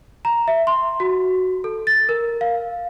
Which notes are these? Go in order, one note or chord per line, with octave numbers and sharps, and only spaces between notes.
A#5
E5
C6
F#4
A4
A6
A#4
F5